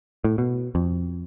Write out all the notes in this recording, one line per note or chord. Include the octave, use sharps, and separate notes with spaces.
A2
B2
F2